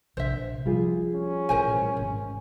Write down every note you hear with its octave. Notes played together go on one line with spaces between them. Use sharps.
A#1 C3 C5 E5
F3 G3 F4 G#4
C#4
A1 A#2 A#4 C5 G#5
G#1